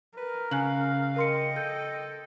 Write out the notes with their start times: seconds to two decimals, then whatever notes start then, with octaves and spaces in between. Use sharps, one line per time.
0.17 A#4 B4
0.51 C#3 F5 G#5 F#6 F#7
1.16 A#4 D#5 G5 C6 C#7
1.56 A4 G6